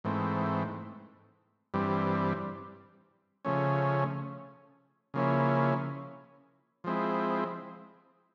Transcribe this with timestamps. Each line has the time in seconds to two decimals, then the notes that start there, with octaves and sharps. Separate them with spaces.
0.04 G#2 E3 A3 C4
1.74 G2 E3 G3 C4
3.45 C#3 F3 A3 C#4
5.14 C#3 F3 A#3 C#4 E4
6.84 F3 G#3 C4 E4